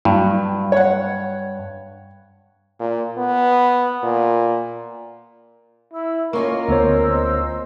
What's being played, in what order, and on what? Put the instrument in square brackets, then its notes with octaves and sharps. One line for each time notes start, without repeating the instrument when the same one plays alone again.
[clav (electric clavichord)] G2 [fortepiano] F#3
[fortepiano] C#5 F#5
[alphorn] A#2
B3
A#2
[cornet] E4 [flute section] E6
[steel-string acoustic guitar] A#3 C#4 F4 [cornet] A#4 [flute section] D#5 C#6
[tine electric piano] D2 B3 C#5 [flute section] C5 D#5 E6